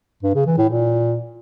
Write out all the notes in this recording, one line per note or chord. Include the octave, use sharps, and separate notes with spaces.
G2
C#3
E3
A2
A#2